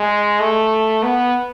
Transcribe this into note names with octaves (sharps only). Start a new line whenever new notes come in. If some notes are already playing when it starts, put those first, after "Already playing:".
Already playing: G#3
A3
B3